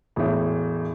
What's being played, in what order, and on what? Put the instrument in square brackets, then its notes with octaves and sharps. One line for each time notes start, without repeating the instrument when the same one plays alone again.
[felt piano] E1 A2